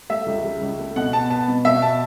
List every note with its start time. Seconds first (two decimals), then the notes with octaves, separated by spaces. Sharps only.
0.09 A3 E5
0.26 C#2
0.44 C#3
0.61 C#2
0.79 A3
0.96 B2 F#5
1.13 B3 A5
1.30 B3 A5
1.48 B2
1.65 B2 E5
1.82 B3 A5